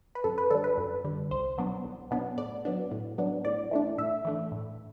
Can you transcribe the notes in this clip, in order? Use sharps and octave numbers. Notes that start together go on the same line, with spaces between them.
B4
F#2 A4
B4
D3 G3 A4
B4
F#2
D3 G3
C2 C5
B2 F#3 B3 D4
C2
B2 F#3 B3 D4
A2 D5
F#3 B3 D4
A2
F#3 B3 D4
A2 D5
E3 A3 D4
A2 E5
E3 A3 D4
A2